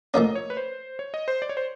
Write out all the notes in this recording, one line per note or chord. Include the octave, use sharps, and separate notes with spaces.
A2 F3 A#3 C#4 D#5
C#5
B4
C5
C#5
D#5
C5
D5
C#5
C5